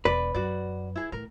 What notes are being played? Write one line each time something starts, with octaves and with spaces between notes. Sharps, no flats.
E1 B4 D5
F#2 F#4 D5
E4 G#4
A2 A#4